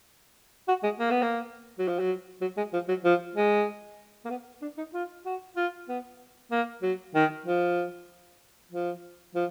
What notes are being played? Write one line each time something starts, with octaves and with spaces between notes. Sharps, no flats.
F#4
G#3
A#3
B3
A#3
F#3
F3
F#3
F#3
G#3
F3
F#3
F3
G#3
A#3
B3
D4
D#4
F4
F#4
F4
B3
A#3
F#3
D#3
F3
F3
F3